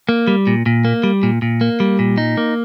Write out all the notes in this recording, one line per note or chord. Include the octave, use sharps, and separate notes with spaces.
A#3
G3
A#2
A#2
A#3
G3
A#2
A#2
A#3
G3
A#2
D#4
A#3